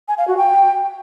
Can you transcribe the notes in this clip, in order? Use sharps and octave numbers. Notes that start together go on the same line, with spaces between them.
G#5
F5
F#4
G5